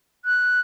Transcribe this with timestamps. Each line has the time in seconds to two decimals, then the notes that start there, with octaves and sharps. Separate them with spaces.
0.25 F#6